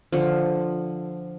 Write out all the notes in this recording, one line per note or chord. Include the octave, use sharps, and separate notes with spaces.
D3 F3